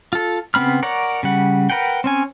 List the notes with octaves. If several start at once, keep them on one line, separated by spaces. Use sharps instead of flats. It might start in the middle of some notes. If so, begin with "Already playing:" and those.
F4 A4
C#3 B3 C4 B5 F6
A#4 C#5 D5 F#5
C#3 G3 F#5
A#4 B4 F#5 G5
C4 C#4 G#5